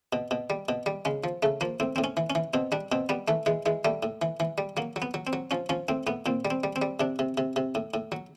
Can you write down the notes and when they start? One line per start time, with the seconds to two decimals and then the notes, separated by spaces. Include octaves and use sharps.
0.13 B2
0.31 B2
0.50 G3
0.69 B2
0.86 G3
1.05 C#3 G#3
1.24 F3
1.43 C#3 A3
1.61 F3 A#3
1.80 A2 C4
1.96 A2 C4
2.04 C#4
2.17 E3
2.30 C#4
2.35 E3
2.54 B2 C4
2.72 G3 D4
2.92 B2 C4
3.09 G3 B3
3.28 E3 A3
3.46 E3 G#3
3.66 E3 G#3
3.85 G3 A3
4.03 A2
4.22 E3
4.40 E3
4.58 G3
4.77 F#3 A#3
4.96 F#3
5.02 B3
5.14 F#3
5.27 C4
5.33 F#3
5.51 F3 C#4
5.69 F3 C#4
5.89 A2 C4
6.07 A2 B3
6.26 A#2 C4
6.45 G3
6.50 C4
6.64 G3
6.76 C4
6.82 G3
7.00 C3 D4
7.19 C3
7.38 C3
7.56 C3
7.75 A2
7.94 A2
8.12 F#3